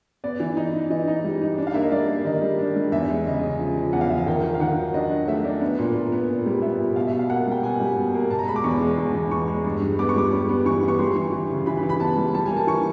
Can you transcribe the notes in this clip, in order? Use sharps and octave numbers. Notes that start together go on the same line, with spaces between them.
B3 D5
E3
D#4
D#4
E3 D#5
D#4
G3
D#4
D4
F5
A#3 E5
D#5
G3 D5
A#3
D#3 D#5
G3
D4
G3
E2 E5
G#3
C#3 D#5
C#3
F3
F3
E2 F#5
F5
F3 E5
F5
D#3 G5
D#3
F5
D#3 F#5
F#3
D4 D#5
F#3
A3 E5
D4
B3
A#2
A#2
B3
A#2
G3
B3 E5
A#2
B2 F5
E5
B2
F5
A#3 F#5
G3 G5
B2 G#5
G3
B2
A#3
B2 A5
A#5
G#3 B5
D6
E2 C#6
G#3
E2
E2
E2 C#6
G#3
G2
G3
B3 D6
C#6
G3 D6
G3
B3
E3 C#6
B3
C#6
G3 C6
E3
E3
C#3
E3 B5
B5
E3
B5
B3 A5
G3
G3 A5
G#5
A#3
A5
E3 C#6